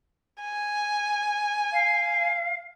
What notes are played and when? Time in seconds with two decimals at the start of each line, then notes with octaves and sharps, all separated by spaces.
0.41 G#5
1.72 F5